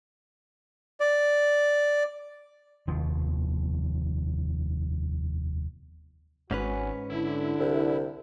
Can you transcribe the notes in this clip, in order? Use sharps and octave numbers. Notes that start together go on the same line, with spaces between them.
D5
F1 D#2 D#3 F3
G#1 G#2 C#4 F#4 B4 C#5 G#5
D3 E4
C2